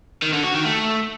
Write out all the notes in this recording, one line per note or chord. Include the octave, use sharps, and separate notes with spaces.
D#3
D3
F#4
D#3
A3